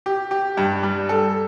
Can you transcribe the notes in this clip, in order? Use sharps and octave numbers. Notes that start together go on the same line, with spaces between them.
G4
G4
G2
G3
A4